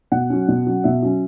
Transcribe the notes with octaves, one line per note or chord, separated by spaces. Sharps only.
B2 F#5
F#3 C#4
B2
F#3 C#4
B2 E5
F#3 C#4